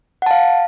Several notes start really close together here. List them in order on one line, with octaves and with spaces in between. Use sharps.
F#5 A5 F5